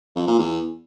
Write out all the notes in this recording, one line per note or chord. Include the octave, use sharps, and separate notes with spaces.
F2
A#2
E2